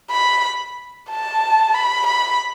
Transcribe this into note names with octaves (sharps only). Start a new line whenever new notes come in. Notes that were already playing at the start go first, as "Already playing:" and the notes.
B5
A5
B5
B5